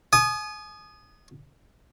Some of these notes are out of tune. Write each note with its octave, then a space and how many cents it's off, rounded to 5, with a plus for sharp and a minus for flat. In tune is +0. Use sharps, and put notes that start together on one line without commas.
G#5 +35 D#6 -15